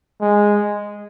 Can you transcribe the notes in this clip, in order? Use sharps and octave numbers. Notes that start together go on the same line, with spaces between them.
G#3